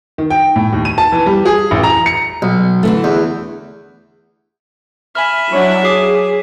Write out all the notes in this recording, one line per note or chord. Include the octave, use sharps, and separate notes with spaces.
D#3
G5
A2
D#2
D#7
A5
E3
G3
G#4
A1
A#5
C#7
B1
D3 E3 A3
E2
E5 G#5 B5 F6
F#3 D4 E4 C#5
G#4 D6 D#6 C7